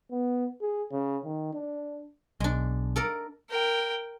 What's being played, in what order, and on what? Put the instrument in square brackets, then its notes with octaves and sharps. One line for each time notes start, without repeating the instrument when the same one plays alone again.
[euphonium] B3
G#4
C#3
D#3
D4
[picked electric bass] B1 [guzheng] G#3 D4
[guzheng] A4 A#4 D5
[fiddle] A#4 G5